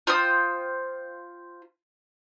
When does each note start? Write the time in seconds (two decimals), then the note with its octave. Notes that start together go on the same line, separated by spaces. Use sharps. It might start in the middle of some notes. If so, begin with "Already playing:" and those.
0.07 F4 C5 G5 D#6